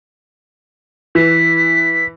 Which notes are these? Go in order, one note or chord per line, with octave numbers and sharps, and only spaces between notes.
E3 B6